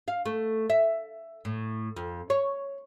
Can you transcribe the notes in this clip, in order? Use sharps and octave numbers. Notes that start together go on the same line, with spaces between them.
F5
A3
E5
A2
F2
C#5